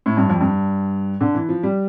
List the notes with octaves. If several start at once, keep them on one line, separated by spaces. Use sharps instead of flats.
A2
G2
F2
G2
D3
E3
F3
G3